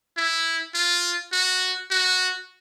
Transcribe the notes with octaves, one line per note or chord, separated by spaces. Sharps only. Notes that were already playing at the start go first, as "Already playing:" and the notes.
E4
F4
F#4
F#4